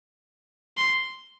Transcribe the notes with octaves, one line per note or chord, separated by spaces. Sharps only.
C6